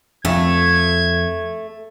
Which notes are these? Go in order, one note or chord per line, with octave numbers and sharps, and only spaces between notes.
F2 A3 G#6